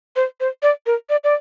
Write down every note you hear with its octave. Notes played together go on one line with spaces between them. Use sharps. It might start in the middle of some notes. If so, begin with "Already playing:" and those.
C5
C5
D5
A#4
D5
D5